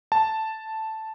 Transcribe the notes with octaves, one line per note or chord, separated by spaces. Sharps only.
A5